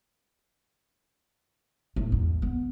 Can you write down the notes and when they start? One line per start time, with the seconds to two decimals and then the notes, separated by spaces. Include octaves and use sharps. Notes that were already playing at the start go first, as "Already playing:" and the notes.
1.96 A2
2.12 E2
2.42 B3